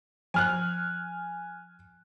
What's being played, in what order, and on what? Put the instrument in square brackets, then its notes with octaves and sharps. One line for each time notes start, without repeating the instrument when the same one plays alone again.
[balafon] F3 [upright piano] G#5 F6 F#6